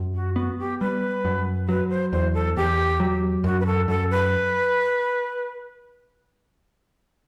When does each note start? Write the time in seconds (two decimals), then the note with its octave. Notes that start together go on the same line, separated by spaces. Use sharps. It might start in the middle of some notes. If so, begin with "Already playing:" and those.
Already playing: F#2
0.15 F#4
0.36 B3 F#4
0.59 G4
0.80 G3 B4
1.25 F#2
1.68 F#3 B4
1.90 C5
2.12 E2 C5
2.34 A4
2.56 E2 G4
3.00 F#3
3.44 F#2 F#4
3.60 B4
3.66 A4
3.88 F#2 A4
4.11 B4